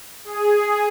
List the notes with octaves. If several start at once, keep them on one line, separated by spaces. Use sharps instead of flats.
G#4